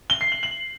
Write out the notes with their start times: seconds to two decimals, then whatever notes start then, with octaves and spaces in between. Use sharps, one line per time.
0.10 G7
0.21 C7
0.32 F#7
0.43 F#7